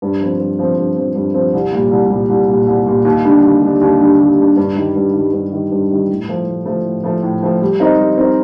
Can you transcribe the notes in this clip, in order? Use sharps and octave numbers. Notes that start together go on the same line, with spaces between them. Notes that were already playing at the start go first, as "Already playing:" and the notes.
G2
F3 C4
G2
F3 C4
G2
F3 C4
G2
F3 C4
C2
A#2 G3
C2
A#2 G3
C2
A#2 G3
C2
A#2 G3
D#2
D3 G3 D4
D#2
D3 G3 D4
D#2
D3 G3 D4
D#2
D3 G3 D4
G2
D#3 G3
G2
D#3 G3
G2
D#3 G3
G2
D#3 G3
A2
F3 A3
A2
F3 A3
A2
F3 A3
A2
F3 A3
G3
C4 D#4 A#4 D#5
G3
C4 D#4 A#4 D#5